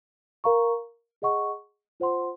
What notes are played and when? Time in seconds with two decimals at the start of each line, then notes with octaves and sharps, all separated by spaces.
0.44 A#4 F5 A#5 C#6
1.22 G#4 D#5 F#5 C#6
2.00 F4 C5 F#5 C6